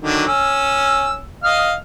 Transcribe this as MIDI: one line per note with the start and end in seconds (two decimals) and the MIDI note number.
0.01 0.25 50
0.01 0.25 51
0.01 0.25 54
0.28 1.19 61
0.28 1.19 88
1.44 1.74 75
1.44 1.74 77
1.44 1.74 89